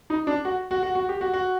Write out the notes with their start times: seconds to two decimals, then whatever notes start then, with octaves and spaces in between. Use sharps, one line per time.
0.10 D#4
0.27 D4
0.45 F#4
0.71 F#4
0.83 F#4
0.95 F#4
1.09 G4
1.21 F#4
1.34 F#4